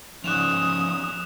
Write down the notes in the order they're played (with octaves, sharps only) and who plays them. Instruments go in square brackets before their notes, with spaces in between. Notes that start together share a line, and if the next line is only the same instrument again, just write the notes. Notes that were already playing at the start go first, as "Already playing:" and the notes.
[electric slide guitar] F3 D#4 D5 [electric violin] C#4 D#6 [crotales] F#6 E7 F7